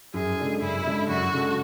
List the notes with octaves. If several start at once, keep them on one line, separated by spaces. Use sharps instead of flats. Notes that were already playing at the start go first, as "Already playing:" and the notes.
F#2 G#4
C#3 G#3 D4 A4
F#2 E4
C#3 G#3 D4 A4
F#2 F#4
C#3 G#3 D4 A4